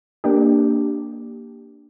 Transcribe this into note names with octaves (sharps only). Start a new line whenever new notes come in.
A#3 D4 G4